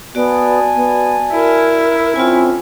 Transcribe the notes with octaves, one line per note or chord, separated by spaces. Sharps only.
B3 F#4 D5 G#5 A5
B3
E4 A#4
D3 C4 C#4 F4 G#5